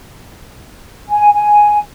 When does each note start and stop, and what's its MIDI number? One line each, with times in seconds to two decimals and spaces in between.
1.09 1.34 80
1.34 1.80 80